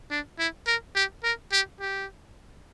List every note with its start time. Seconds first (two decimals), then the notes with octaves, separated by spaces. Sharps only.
0.11 D4
0.39 E4
0.67 A#4
0.96 G4
1.24 A#4
1.52 G4
1.80 G4